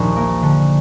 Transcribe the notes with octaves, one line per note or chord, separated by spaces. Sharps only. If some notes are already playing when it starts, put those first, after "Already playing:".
Already playing: A#1 D#2 A#2 D#3
A#3
D3